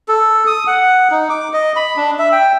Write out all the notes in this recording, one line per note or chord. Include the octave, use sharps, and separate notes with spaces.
A4
D#6
F#5
D#4
D6
D#5
B5
D4
E5
G5